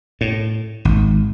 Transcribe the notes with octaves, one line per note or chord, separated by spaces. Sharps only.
A2
G#1